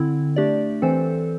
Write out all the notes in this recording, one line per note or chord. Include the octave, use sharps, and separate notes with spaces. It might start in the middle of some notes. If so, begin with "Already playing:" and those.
Already playing: D3 C4 E4
A3 D4 G4 D5
E3 C4 A4 C5